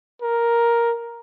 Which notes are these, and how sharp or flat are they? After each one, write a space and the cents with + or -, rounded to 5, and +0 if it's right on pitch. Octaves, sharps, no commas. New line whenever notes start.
A#4 +5